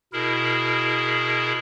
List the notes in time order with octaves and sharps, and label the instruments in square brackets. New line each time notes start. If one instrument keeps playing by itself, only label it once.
[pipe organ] B2 E4 G#4 A#4